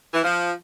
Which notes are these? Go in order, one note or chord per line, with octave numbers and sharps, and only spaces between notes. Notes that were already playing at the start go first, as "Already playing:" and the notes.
E3
F3